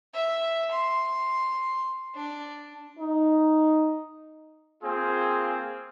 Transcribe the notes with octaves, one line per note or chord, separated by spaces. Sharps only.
E5
C6
D4
D#4
A#3 C4 F4 G#4 G#5